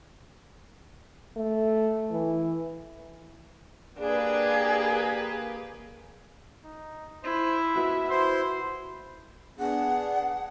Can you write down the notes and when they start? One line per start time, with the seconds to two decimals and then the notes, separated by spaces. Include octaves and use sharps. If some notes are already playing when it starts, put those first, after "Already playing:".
1.36 A3
2.11 E3
3.99 A#3 D4 G4 G#4 B4
6.65 D#4
7.24 E4 C5
7.76 F#4 B4 E5
8.10 E4 C5 C6
9.59 B3 D4 G#4 F#5